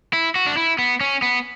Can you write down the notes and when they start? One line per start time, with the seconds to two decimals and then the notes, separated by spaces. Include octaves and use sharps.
0.13 E4
0.35 F#4
0.47 D4
0.57 E4
0.79 B3
1.01 C#4
1.22 B3